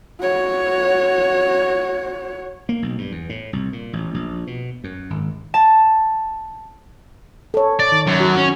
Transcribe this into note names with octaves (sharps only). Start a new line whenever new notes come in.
F#4 C#5
A#3
B1
G2
E2
A2
C2
A#2
A1
A#1
B2
F#2
G#1
A5
A4 C#5
D5
D#3
F#2 F#3
F#4
C#4